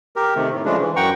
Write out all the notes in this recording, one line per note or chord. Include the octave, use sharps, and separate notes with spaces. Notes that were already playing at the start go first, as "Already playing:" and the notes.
G4 A#4
C3 D#3 A3
A2
C#3 F3 G#3 A3 D4
E3
F#2 F#5 G5 A#5 C#6